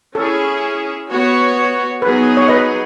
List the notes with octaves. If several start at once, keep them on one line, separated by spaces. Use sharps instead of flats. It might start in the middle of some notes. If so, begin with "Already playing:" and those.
C#4 E4 G#4 A4
B3 F#4 C#5
F#3 B3 D#4 G#4 B4
C#5
B4 D#5